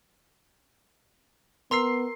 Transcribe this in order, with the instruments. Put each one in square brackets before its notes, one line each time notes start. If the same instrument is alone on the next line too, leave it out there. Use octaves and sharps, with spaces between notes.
[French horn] B3 [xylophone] A#4 A#5 E6 [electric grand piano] C6 C7